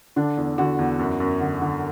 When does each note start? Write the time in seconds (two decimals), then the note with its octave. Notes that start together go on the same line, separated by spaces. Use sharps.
0.16 D3 D4
0.37 E2
0.58 D3 F#4
0.79 E2
0.99 F#2
1.20 F#2
1.41 D3
1.62 D3